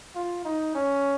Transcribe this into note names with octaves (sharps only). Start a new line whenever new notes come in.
F4
D#4
C#4